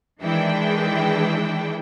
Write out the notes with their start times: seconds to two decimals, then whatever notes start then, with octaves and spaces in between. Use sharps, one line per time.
0.21 D#3 E3 G#3 D4 E4 G5